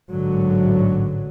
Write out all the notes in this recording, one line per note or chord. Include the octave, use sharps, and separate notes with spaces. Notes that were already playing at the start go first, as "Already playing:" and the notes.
A1 G#2 D3 F#3